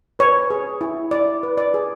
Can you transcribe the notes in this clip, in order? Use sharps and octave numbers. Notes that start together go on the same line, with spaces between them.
B4 C#5
G#4
E4
E4 D5
B4
D5
G#4